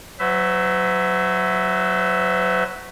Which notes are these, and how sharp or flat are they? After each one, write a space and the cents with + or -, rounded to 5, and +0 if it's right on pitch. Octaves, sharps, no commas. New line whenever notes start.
F#3 +0 C5 -45 E5 +0